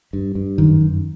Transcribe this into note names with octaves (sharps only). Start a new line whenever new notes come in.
G2
G2
F#2 D#3
F#2